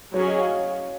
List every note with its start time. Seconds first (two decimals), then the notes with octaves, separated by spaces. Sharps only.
0.14 F#3 C#4 G#4 C#5
0.27 D#5
0.38 F5